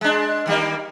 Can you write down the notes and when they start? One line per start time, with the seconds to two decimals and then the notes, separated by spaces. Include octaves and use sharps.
0.01 G#3 D4
0.46 D#3 G3 A#3